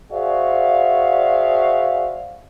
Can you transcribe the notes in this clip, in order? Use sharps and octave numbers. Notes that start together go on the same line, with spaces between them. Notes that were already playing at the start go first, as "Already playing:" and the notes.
F#4 G#4 C5 D5 E5 F5